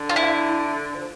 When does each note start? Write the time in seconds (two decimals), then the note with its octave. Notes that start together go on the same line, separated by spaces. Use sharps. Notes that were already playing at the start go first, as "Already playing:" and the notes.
Already playing: D3
0.09 F4
0.16 E4
0.95 F3